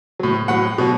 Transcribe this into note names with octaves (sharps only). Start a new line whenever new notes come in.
A2 F#3
A2 F#3 F#5
B2 F#3